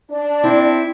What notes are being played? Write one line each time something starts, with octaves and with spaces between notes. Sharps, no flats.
D4 D5
C4 E4